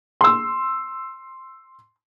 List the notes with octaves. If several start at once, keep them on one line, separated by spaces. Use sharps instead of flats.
C6 E6